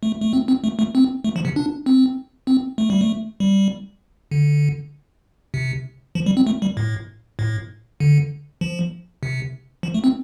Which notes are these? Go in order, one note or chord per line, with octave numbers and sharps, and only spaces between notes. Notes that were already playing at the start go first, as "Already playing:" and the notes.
A3
A3
C4
C4
A3
A3
C4
A3
F3
C3
D4
C4
C4
A3
G3
A3
G3
D3
C3
F3
G3
C4
A3
G3
A2
A2
D3
F3
C3
F3
A3
C4